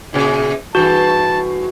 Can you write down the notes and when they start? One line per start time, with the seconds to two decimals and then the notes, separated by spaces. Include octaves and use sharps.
0.13 A#2 C#3 E4
0.75 G2 E3 A3 F#4 A5